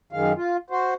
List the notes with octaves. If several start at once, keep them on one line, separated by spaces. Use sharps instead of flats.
F#2 D#3 G#3 F5
F4
F#4 C5